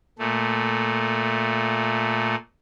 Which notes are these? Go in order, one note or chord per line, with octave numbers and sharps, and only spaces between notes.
A#2 A3